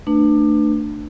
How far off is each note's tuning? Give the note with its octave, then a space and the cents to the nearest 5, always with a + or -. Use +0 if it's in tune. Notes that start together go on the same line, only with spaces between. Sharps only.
A3 +30 D4 +25 B4 +0